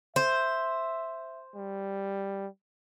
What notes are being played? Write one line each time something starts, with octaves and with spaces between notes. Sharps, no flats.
C5 E5
G3